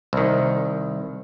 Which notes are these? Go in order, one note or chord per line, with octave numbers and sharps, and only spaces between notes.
C2 D#3